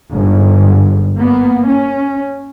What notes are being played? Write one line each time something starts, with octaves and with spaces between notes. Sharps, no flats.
G1 G#2
A#3 B3
C#4